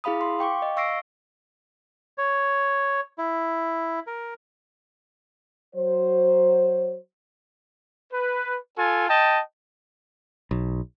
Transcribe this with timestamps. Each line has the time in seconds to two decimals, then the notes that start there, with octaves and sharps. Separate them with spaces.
0.04 E4 G#4 F5 B5 D#6
0.21 C6
0.39 F5 G5 C#6 D6
0.62 D#5
0.77 F5 C#6 E6 A#6 C7 D7
2.18 C#5
3.18 E4
4.07 A#4
5.75 F#3 C5
8.12 B4
8.77 F4 A4 G#5
9.09 D#5 G5 A5
10.51 B1